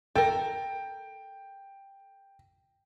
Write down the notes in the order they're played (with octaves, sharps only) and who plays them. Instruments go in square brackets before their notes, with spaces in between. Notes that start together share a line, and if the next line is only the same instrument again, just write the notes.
[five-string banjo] A4 A#4 [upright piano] G5